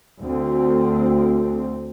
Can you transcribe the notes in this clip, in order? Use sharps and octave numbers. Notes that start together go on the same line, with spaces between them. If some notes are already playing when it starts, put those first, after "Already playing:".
D2 C4